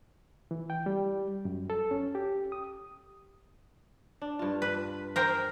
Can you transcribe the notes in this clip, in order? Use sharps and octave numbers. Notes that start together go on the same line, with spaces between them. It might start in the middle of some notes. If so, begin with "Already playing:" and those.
E3
G5
G3
F#2
A4
C#4
G4
D#6
D4
G2 F4
B4
A#4 C5 G5